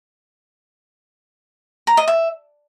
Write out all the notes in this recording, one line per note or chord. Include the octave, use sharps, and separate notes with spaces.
A#5
D#5
E5